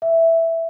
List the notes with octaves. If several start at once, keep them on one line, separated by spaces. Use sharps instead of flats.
E5